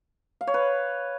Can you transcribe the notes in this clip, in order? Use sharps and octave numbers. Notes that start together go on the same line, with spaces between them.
F5
C#5
B4